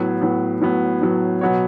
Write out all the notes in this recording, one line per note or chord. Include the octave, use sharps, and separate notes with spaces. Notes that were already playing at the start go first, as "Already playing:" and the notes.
Already playing: A2 F#3 B3
A2 F#3 B3
A2 F#3 B3
A2 F#3 B3
B2 F#3 B3 F#4 C#5